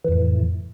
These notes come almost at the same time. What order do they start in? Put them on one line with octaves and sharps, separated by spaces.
E3 F2 A2